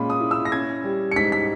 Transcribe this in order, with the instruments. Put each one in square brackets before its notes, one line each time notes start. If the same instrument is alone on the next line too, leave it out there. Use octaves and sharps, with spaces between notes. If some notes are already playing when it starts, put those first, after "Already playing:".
Already playing: [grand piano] A#2 G#3 C#4 B5
D#6
E4
E6
A#6
C#4 G#6
G3
C#7
G#2 B6
B6